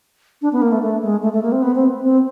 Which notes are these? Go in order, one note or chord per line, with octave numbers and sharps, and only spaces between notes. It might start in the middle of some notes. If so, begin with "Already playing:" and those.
D4
B3
A#3
A3
A3
G#3
A3
A3
A#3
C4
B3
C4
C4